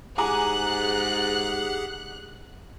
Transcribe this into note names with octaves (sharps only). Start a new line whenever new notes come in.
G#2 G4 G#4 F#5 G#5 A#5 D6 F#6